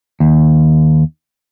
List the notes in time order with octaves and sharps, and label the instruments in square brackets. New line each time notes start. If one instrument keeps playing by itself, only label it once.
[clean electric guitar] D#2